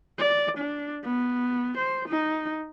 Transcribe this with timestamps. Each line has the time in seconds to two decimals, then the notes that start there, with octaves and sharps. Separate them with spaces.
0.19 D5
0.58 D4
1.04 B3
1.77 C5
2.09 D#4